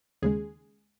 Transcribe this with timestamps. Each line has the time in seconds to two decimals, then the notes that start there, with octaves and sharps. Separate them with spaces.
0.22 D#2 C#3 G#3 G#4